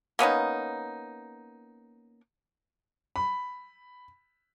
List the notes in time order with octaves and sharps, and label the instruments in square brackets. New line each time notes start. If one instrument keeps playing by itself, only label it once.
[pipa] A#3 B3 C#4 D#4
[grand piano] B5